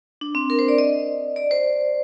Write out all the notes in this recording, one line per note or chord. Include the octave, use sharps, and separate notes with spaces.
D4
C4
A#4
C5
D5
D#5
D5
C5